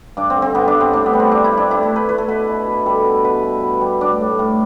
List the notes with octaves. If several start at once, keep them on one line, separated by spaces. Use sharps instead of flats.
G2 D4
C4
D3
C4
G2 B3
D4
G2
C4
A2 D4
B3
G3
C4
G3 D4
E4
G3
D4
A3 E4
A4
A3
B4
A3 B4
A4
B2 B4
B2
B2
G3 A4
B2
B2 B4
B2
B2
G3
A2 D4
A2
A2